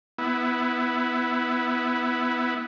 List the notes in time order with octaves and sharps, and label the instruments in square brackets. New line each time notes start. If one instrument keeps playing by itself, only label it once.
[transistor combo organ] B3 E4